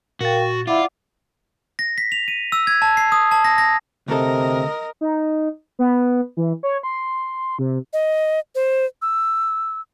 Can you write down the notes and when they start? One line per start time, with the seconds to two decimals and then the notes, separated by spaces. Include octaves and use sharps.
0.21 A#2 F#4 A#4 F5 G5 A6
0.39 C#6
0.67 E4 F4 D5 F#5 D6
1.79 A#6
1.98 B6
2.12 F7
2.28 D#7
2.52 E6
2.67 G#6
2.82 A5
2.97 C7
3.12 D#6
3.32 A5
3.44 A#6
3.58 A#6
4.08 D2 C3 A4 A#4 D#5
5.01 D#4
5.79 B3
6.37 E3
6.63 C#5
6.83 C6
7.59 C3
7.93 D#5
8.55 C5
9.02 E6